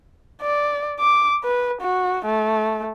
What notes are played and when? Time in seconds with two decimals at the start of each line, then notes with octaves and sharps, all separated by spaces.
0.42 D5
1.00 D6
1.44 B4
1.81 F#4
2.25 A3